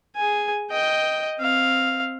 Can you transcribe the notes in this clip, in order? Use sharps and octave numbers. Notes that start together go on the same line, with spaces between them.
G#4 G#5
D#5 G5
C4 F5